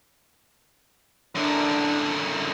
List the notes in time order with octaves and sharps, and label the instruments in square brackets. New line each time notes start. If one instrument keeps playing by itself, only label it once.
[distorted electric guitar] F#2 D3 [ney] D4